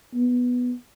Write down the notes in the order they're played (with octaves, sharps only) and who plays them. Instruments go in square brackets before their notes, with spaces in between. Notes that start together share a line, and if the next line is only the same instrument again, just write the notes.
[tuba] B3